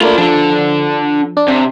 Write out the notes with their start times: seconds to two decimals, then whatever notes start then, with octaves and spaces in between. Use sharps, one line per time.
0.01 A3 A#3 D4 F4 B5
0.18 F3 D4 A4
1.37 D4
1.48 C3